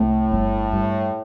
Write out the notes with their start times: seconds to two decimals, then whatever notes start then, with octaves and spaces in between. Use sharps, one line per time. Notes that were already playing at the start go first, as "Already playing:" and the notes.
Already playing: C2 A2 A3
0.32 G1
0.73 G2